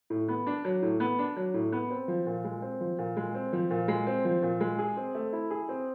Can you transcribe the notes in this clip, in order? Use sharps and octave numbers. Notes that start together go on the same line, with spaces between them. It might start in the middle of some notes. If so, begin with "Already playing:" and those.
A2
B3
D4
F#3
A2
B3
D4
F#3
A2
B3
C4
F3
A#2
G#3
C4
F3
A#2
G#3
C4
F3
A#2
G#3
C4
F3
A#2
G#3
G#4
C4
A3
E4
G#4
C4